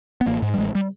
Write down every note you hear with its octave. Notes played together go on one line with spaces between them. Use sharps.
B3
A1 A#3
G#2
G3
A1 G#3
G3